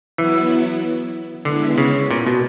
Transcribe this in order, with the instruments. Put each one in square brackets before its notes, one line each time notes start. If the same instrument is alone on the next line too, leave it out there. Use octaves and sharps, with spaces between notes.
[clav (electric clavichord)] E3 [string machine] F#3 B3 E4
[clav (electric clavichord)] D3 [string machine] G#3 B3 E4
[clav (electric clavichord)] C#3
A#2
B2